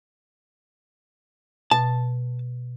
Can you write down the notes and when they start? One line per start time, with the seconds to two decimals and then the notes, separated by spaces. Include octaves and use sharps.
1.71 B2 A5